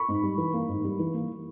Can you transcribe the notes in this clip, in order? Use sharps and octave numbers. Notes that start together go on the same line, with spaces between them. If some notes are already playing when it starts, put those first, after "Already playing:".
Already playing: B5 C#6
G#2
G3
E3
A#3
G#2
G3
E3
A#3